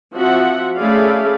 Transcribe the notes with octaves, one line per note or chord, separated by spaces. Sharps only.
F3 C4 F#4 E5 F#5
A3 C#4 E4 G#4 D5 F5